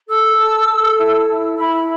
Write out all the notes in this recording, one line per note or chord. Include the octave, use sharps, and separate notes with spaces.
A4 E6
A4
A4
E4
E4
E4 B5